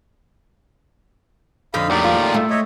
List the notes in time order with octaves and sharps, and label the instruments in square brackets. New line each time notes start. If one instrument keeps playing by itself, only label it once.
[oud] F2 D#4 D#5 [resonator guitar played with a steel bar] D3 [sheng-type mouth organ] F5 B5
[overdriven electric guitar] D#2 A2 [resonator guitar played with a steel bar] F#3 [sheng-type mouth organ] G4 A#4 D5
[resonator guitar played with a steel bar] G#3 F4
[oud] A3
[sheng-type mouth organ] C#5 D#5 E5